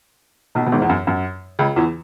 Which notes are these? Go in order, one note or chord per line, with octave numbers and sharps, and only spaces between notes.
B1 B2
B2
G#1 G#2
E2
F#2
F#2
C#2 C#3
E2 E3